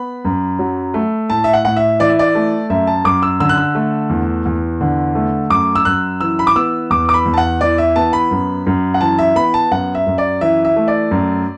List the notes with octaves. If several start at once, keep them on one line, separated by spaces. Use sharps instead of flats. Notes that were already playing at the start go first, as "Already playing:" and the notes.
Already playing: B3 B5
F#2
F#3
A3
A2 A5
E5
F#5
A2 F#5
E5
E3 D5
E5
D5
A3
F#2 E5
A5
F#2 D6
E6
D3 E6
F#6
E6
A3
E2
E2
D3
A3
F#2 D6
E6
F#2 F#6
E3 E6
B5
D6
B3 E6
E2 D6
D6
B5
E2
A5
F#5
E3 D5
E5
B3 A5
B5
F#2
F#2
F#5
E3 A5
E5
B3 B5
A5
F#2 F#5
E5
F#2
D5
E3 E5
E5
A3
D5
F#2